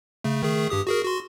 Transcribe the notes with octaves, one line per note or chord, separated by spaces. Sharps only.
C#3 A3
D#3 A3 G#4
G2 G4 D#6
F#4 G#4 A#4
F#4 C6